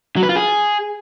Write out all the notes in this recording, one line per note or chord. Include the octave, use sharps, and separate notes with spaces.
F#3
B4
F4
G#4